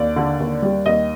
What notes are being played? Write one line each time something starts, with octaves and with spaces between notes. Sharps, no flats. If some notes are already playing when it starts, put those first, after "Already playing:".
Already playing: D#2 D5
D3
D#2
G3
D#2 D#5